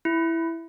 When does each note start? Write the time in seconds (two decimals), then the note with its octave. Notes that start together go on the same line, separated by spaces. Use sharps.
0.05 E4